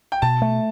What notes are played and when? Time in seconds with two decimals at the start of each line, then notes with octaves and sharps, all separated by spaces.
0.12 G5
0.22 B2 A5
0.42 A3